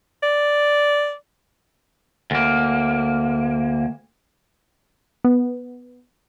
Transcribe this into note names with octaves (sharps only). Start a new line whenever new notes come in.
D5
D2 A#3
B3